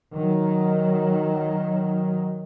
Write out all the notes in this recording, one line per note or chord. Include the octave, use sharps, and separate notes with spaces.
D#3 F#3